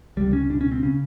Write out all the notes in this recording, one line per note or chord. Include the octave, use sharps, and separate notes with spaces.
C#2 C3 G3
C#4
C#2 B2 D4
C#4
C4
C#3 C#4